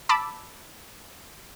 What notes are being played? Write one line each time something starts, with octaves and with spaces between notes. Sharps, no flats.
A5 B5 D6 E6